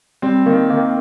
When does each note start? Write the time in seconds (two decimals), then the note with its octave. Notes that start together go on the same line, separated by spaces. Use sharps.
0.22 G3 C4
0.46 D#3 A#3
0.70 D#3 A#3